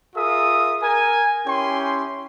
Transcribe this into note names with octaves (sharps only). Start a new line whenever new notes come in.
F4 G#4 A#4 E5 D#6
A#4 G#5
C#4 E4 G4 G5 C6